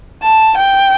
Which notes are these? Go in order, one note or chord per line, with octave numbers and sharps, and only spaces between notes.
A5
G5